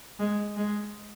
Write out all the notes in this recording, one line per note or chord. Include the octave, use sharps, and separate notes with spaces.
G#3
G#3